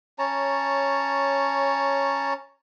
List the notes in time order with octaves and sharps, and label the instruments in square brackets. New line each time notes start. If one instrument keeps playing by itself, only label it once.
[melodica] C#4 C#5 A5 A#5